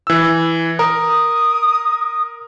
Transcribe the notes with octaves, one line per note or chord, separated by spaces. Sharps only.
E3 E6
A#4 D#6